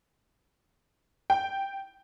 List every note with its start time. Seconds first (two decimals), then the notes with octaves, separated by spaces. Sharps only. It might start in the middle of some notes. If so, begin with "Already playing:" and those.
1.30 G5